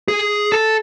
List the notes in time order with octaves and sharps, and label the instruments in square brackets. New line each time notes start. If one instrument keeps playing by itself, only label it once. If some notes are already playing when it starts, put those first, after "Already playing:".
[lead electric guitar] G#4
A4